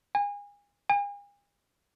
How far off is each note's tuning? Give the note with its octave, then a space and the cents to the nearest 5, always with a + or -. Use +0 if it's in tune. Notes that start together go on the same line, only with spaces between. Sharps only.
G#5 -35
G#5 -40